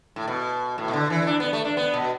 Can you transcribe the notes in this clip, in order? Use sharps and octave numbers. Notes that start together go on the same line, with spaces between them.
A2
B2
A2
B2
D3
E3
D4
B3
A3
D4
B3
B2